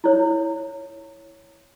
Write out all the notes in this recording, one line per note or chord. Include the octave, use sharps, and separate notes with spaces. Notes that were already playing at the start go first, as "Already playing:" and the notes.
E4 C#5